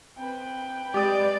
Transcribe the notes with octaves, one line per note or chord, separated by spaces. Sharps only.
C4 B4 G5
G#3 G4 D5 D#6